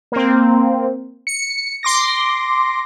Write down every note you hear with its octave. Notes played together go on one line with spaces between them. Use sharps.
A#3 C4
C#7
C6 D6 A#6